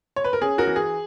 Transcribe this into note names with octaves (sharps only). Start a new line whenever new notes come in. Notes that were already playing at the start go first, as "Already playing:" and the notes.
C#5
B4
A#4
C#4 G#4
F#4 A#4
E3
G#4